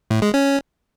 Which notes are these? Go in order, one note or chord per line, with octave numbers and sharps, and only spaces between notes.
A2
G#3
C#4